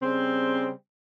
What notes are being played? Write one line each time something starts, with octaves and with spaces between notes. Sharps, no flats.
C#3 G3 C4